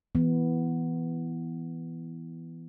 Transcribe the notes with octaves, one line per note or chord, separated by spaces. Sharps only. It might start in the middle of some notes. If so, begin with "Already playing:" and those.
E3 B3